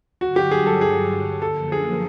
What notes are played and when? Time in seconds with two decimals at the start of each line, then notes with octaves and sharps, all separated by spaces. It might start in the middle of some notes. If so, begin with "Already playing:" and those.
0.21 G2 D3 F#3 F#4
0.36 G4
0.51 G#4
0.66 A4
0.81 G#4
1.42 F#2 D3 F3 A#3 A4
1.72 G#4